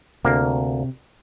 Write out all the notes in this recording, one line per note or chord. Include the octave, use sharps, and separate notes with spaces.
D2 C3 A#3